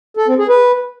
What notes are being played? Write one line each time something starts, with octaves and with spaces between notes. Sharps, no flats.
A4
C4
G#4
B4